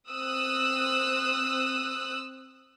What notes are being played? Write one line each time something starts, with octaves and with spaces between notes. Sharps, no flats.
C4 D#6 E6 F#6